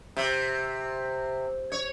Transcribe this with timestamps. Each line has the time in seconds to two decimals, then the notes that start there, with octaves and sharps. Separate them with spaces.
0.16 C3
1.72 C#5